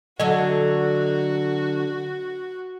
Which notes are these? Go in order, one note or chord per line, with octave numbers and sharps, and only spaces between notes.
D3 F#3 F#4 A4 D#5